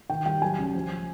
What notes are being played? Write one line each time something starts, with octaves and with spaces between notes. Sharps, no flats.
D#3 G5
G3 G5
F#3 G#5
C#2
F3